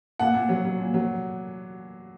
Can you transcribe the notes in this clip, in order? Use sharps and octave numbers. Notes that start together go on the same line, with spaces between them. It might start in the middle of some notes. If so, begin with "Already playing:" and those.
A#2 F#5
A#2
F#3
F#3
A#2
F#3